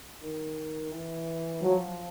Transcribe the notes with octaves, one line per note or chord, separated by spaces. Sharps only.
D#3
E3
F3 F#3